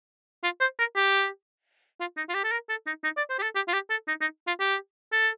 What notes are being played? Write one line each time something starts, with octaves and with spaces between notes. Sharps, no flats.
F4
C5
A#4
G4
F4
D#4
F4
G4
A4
A#4
A4
D#4
D#4
D5
C5
G4
A4
G4
F4
G4
A4
D#4
D#4
F4
G4
A4